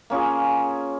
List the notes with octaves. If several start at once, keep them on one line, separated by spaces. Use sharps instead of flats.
A#3 C#4 F4 G#4